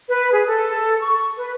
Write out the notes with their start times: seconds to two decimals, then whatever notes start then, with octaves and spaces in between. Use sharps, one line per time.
0.08 B4
0.32 G#4
0.46 A4
1.00 C#6
1.37 B4